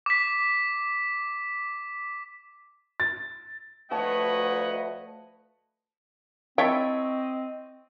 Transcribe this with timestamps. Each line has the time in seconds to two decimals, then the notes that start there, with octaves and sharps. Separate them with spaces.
0.06 D6 B6
3.00 A6
3.91 D2 F3 A3 B4 C#5 D#5 F#5 A5
6.58 C4 E4 A4 C#5 D#5 G5